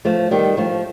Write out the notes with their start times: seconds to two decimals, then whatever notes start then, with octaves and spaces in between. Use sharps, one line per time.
0.05 F3 A3
0.31 D#3 G3
0.57 F3 A3